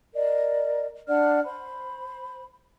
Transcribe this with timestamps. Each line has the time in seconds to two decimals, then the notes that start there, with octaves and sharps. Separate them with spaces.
0.14 A#4 D5 D#5
1.08 D4 D5 F#5 F6
1.44 C5 B5